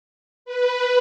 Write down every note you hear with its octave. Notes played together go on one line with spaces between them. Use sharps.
B4